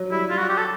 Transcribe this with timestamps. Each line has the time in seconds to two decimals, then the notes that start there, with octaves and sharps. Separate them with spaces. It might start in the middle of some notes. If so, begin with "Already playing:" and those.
Already playing: F#3
0.11 G3 E4
0.30 G3 F4
0.39 F#4
0.49 G4
0.58 A4